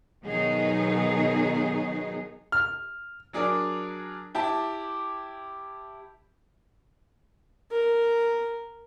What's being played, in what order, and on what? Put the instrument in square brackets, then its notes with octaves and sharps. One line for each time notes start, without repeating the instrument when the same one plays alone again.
[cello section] B2 D#3 F#3 B3 D#4 G#4
[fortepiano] F6
[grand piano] F#3 D4 G#4 A#4 D5
E4 G4 A5 D6
[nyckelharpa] A#4